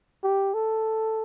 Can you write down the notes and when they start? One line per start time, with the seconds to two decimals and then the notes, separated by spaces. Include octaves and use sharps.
0.24 G4
0.54 A4